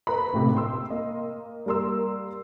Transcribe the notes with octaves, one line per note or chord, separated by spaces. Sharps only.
B4 A#5 B5
G#1 A2 C3
G5 C6 E6
A#3 D#5
G3 A#3 A#4 C6 E6